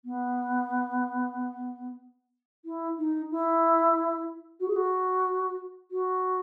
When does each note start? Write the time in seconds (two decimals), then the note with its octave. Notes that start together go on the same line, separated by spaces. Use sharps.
0.05 B3
2.65 E4
2.99 D#4
3.31 E4
4.60 F#4
4.68 G#4
4.76 F#4
5.91 F#4